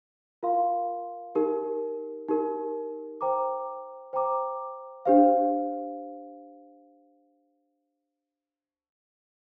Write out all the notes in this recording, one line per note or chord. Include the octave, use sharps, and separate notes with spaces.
F4 A#4 F5 C6
D#4 G4 A#4
D#4 G4 A#4
C5 G5 A#5 D6
C5 G5 A#5 D6
D4 G4 C5 F5